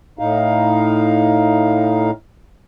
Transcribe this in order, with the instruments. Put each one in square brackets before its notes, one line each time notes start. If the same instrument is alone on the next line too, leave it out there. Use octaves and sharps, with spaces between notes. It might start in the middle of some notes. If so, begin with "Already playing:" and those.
[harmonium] A2 D#4 F5